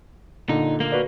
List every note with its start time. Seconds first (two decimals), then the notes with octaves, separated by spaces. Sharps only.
0.49 A#2 D3 D#4
0.80 A#3
0.92 F#4 B4 D5